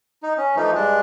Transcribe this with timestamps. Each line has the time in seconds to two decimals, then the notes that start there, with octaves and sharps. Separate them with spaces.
0.23 D#4
0.38 C#4
0.56 E3 F3 A3 D#4
0.75 G2 G#3 D4